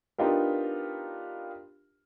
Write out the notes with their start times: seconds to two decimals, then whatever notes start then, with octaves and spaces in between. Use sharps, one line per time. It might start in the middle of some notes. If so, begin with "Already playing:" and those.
0.18 B3 D4 D#4 F4 G4 A#4